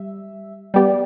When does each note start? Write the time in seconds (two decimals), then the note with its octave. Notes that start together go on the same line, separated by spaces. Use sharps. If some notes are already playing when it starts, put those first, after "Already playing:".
Already playing: G3 E5
0.74 G3 B3 G4 D5